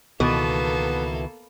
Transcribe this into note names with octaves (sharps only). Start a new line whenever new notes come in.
C#2 B2 D#3 E3 A#3 B3 A4